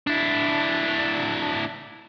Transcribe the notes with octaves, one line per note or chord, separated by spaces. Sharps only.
D4 E4